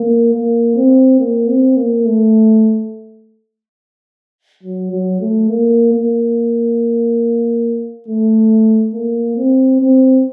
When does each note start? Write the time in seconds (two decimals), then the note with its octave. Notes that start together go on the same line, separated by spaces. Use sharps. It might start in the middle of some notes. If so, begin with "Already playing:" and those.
Already playing: A#3
0.33 A#3
0.76 C4
1.19 A#3
1.48 C4
1.76 A#3
2.06 A3
4.63 F#3
4.92 F#3
5.20 A3
5.50 A#3
5.93 A#3
8.08 A3
8.94 A#3
9.37 C4
9.80 C4